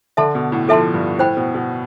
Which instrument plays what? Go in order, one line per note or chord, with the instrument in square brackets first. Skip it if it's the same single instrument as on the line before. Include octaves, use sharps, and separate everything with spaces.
[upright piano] D3 [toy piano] A4 E5 A5 C6
[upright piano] B2
A2
[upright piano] F3 [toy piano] A4 E5 A5 C6
[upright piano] G2
[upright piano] A2 [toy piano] C5 G5 B5
[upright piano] B2
B2